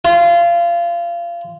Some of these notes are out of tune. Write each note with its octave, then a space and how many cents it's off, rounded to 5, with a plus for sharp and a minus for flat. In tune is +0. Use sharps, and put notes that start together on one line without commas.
F4 -25